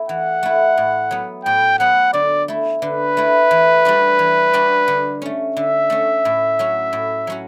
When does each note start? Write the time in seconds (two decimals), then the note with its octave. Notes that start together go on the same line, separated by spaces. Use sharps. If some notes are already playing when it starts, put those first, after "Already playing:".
Already playing: A3 E4
0.09 E3 F#5
0.43 A3 E4
0.77 A2
1.11 F#3 B3
1.45 A2 G5
1.79 F#3 B3 F#5
2.13 D3 D5
2.48 A3 E4
2.82 D3 B4
3.17 A3 E4
3.51 E3
3.85 G3 D4 F#4
4.19 E3
4.54 G3 D4 F#4
4.88 D3
5.22 A3 C#4
5.56 D3 E5
5.90 A3 C#4
6.25 A2
6.59 F#3 C#4 F#4
6.93 A2
7.27 F#3 C#4 F#4